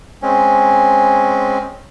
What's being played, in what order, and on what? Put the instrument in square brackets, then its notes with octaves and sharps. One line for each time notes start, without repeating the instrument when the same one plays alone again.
[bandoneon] G#3 C4 C#4